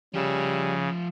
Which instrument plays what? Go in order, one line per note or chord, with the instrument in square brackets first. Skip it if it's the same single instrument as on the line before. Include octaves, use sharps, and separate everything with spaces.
[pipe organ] C#3 [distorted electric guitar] F3 E5 [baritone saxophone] G3